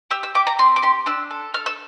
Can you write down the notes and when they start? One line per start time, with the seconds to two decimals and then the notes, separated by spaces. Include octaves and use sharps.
0.11 G4 E6
0.23 E6
0.35 G4 D6
0.47 A#5
0.59 C4 C6
0.76 D6
0.82 G4 C6
1.06 D4 E6
1.31 A4
1.54 A4 F6
1.66 E6